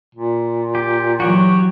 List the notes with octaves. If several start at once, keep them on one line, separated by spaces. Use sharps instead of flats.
A#2
G4
E3 F#3 F#4 G4 C#5